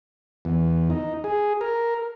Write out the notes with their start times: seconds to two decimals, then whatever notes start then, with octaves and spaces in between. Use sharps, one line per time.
0.45 E2
0.90 D#4
1.24 G#4
1.61 A#4